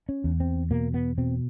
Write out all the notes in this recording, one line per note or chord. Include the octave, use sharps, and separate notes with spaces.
C#4
E2
C4
B2 A#3
B3
B2 C4